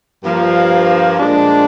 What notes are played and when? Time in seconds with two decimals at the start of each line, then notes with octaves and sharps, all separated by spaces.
0.23 G2 F3 A#3
1.19 A#2 F3 G#3 D4